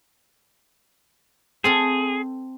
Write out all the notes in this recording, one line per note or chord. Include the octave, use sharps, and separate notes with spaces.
C4 G#4 A4 F5